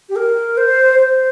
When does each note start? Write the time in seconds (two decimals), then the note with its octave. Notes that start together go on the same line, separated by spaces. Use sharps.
0.09 G4
0.16 A#4
0.57 C5
0.99 C5